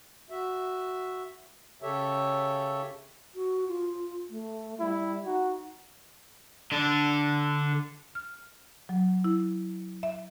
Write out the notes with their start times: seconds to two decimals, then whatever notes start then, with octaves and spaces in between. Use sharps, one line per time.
0.30 F#4 E5
1.82 C#3 G4 A4 C#5 E5
3.35 F#4
3.68 F4
4.30 A3
4.80 G3 E4
5.25 D#4 F#4
6.72 D3 D4
8.15 F6
8.89 F#3
9.24 E4
10.03 E5